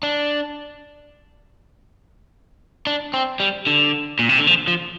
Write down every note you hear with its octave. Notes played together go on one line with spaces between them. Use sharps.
D4
D4
C4
G3
D3
A#2
C3
D3
F3
F3